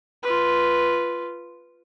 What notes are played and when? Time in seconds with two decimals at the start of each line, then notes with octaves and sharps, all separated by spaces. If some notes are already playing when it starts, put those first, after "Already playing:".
0.23 F4 B4